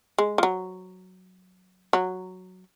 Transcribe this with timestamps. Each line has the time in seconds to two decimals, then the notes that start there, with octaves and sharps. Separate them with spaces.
0.18 G#3
0.38 F3
0.43 F#3
1.93 F#3